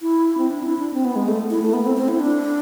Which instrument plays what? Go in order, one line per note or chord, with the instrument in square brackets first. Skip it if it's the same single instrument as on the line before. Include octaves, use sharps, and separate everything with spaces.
[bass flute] E4
C4
D4
E4
D4
C4
B3
G#3
A3
E4
A3
B3
C4
C4
E4
D4